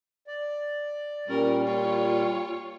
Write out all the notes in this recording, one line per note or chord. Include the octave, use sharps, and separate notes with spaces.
D5
A#2 G3 C#4 A#4
F4 C#5